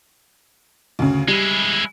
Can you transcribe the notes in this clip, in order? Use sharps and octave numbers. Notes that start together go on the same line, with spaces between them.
D2 C#3
G3 G#3 E4